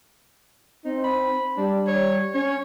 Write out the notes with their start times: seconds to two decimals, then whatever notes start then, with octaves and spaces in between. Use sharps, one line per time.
0.85 C4 D#4
1.04 B5
1.57 G3 D4
1.87 C#5
2.34 C#4 C#5